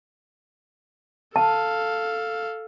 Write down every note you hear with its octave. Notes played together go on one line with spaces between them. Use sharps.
A4 F5 A5